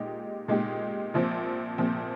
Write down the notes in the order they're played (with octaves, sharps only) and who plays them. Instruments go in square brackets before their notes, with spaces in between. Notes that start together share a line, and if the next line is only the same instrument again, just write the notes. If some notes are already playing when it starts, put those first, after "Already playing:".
Already playing: [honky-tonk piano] A#2 G#3 D#4 G4
A#2 G#3 D#4 G4
A#1 A#2 F3 C4
A#1 A#2 F3 C4